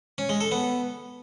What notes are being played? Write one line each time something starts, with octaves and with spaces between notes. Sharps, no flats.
C#4
G#3
A4
B3